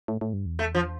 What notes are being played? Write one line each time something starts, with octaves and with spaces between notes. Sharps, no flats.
A2
A2
G2
E2
A3
F3